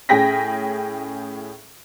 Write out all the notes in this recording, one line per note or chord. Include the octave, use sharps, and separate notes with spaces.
A2 C#4 G#4 G5 A#6 B6